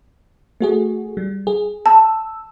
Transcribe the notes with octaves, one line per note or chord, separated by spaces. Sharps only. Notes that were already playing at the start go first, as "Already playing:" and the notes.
A3 F#4 G#4
G3
G#4
A5 E6